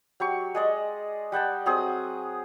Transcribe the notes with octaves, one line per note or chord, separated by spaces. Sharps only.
F#3 G4 C#6
G#3 G#4 D5 D#5
G3 F#5 G5 A5
F#3 C4 G#4 D#6